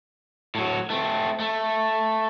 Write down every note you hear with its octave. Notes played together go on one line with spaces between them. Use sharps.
A2 F#3
A3 C4
A3